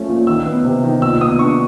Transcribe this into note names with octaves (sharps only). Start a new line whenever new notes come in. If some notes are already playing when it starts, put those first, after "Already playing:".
Already playing: F3 A3 C#4
A#2
D#3 E6
B3
C3
D#3
A#2 E6
B3 D#6
D4 C#6